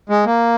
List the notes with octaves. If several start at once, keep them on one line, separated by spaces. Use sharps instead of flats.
G#3
A#3